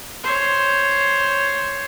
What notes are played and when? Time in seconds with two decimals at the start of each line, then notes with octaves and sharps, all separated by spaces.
0.23 C5 C#5